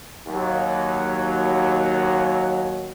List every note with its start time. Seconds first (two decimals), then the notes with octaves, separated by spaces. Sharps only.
0.27 D#2 F#3